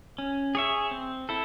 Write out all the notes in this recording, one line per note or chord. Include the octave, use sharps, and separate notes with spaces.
C#4
G#4 C#5 E5
C4
E4 A4